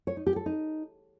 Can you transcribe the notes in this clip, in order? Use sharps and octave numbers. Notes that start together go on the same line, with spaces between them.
C#5
D#4
G4
A4
D#4